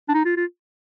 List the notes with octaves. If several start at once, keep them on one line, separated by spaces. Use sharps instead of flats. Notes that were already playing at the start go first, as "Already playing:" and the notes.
D4
D#4
F4
F4